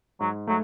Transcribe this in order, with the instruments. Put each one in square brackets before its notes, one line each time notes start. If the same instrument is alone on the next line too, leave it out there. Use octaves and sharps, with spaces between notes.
[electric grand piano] G#2 [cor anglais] F#3
[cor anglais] F#3 [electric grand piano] A3